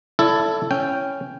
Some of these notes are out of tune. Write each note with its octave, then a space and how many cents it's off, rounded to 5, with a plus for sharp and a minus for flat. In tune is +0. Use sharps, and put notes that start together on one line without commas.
E4 +20 A4 +0 D5 -30
C#4 +0 G5 +0